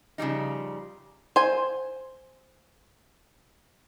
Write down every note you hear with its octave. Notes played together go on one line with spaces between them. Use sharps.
C#3 F3 G3 D#4
C5 G#5